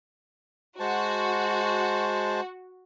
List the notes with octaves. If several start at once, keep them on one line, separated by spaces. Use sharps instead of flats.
G#3 F#4 C5 A5